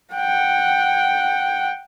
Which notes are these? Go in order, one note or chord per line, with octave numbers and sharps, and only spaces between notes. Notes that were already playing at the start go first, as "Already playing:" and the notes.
F#5 G5